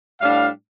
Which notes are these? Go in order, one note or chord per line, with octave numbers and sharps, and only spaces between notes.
A2 G3 D4 F5